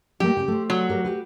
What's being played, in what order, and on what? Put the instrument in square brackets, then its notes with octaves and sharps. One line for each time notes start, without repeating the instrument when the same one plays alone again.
[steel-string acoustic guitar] G3 A3 A#3 [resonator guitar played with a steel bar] G4
[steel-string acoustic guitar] C#3 G5
A3 C5
[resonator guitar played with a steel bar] F#3
[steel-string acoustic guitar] G4 A#4 C#5
F#4 G4 B4